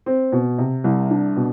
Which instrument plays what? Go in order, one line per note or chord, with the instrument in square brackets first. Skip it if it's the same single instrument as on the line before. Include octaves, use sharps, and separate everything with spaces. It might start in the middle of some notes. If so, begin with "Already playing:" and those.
[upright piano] C4
B2
C3
C2
D4
B2